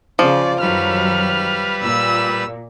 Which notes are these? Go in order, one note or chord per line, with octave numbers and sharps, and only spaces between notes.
C#3 F3 D5
F#2 D#3 F#3 G3 B4 F6
A#2 E6